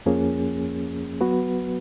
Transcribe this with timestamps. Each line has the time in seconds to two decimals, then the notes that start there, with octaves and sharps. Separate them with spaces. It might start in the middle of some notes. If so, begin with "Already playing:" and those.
0.06 F2 F3 A#3 C#4 G#4
1.21 F#3 B3 F#4 B4